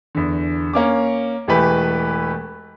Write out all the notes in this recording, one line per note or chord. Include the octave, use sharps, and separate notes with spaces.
E2 D3
A#3 C#4 D6
E1 E3 A3 G4 B4